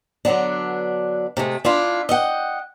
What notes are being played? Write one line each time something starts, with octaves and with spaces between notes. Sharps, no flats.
D3 F#3 B3 D4
C3 G#3 A3
D4 E4 F4
D#5 E5 F#5 G5